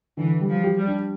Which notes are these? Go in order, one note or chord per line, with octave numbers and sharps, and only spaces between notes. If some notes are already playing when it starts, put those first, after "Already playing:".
D3 E3
G3
F3
G4
G3
D4